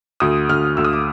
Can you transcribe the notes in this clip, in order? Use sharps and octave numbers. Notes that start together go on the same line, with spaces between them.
D2 D#6
D2 F6
D2 E6
D#6
D6